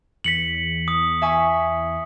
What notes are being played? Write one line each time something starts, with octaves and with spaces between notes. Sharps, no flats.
E2 B6 C#7 F#7
D#6
E5 G#5 C#6